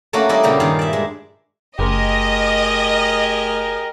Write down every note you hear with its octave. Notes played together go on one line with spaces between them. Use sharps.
A3 A#3 C#4 D4 F#4
G3 A#3 E4 D5 D#5
A#2 C#3 A#3 G4
G2 D#3 G#4 F5
D5 E5
G#3
F#1 A3 G4 G#4 A#4 D#5 C6 D6